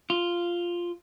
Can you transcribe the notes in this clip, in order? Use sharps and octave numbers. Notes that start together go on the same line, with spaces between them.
F4